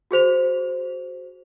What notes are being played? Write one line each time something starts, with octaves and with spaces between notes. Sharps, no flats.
F#4 G#4 C5 F7